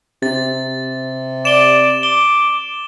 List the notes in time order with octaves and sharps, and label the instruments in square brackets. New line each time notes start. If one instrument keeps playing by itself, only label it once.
[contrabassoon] C3 [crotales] A6
[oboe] D5 [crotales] E7 G7
[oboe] D6 [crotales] G7